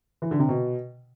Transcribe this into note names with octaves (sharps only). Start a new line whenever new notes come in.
E3
D3
C3
B2